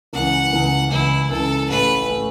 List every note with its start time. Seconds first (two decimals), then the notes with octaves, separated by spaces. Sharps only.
0.13 C#2 C#3 E3 F#5
0.53 C#2 C#3 E3
0.91 C#2 C#3 E3 E4
1.30 C#2 C#3 E3 A4
1.69 A1 A2 A3 C#4 B4
2.09 A2 A3 C#4